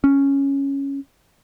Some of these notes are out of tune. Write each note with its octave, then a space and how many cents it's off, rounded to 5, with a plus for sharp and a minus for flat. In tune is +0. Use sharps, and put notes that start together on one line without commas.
C#4 +0